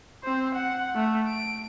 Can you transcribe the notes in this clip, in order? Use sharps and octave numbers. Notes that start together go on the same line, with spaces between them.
C4 C5
F#5
A3
D7